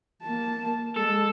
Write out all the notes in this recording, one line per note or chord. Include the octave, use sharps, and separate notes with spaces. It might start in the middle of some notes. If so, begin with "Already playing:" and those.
A#3 A5
G#3 A4